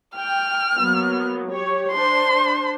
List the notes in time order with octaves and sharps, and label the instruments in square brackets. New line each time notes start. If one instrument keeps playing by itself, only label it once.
[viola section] G5 [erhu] F6
[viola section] F#3 A#3 B3
G4 C#5
[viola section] D4 C5 [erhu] C6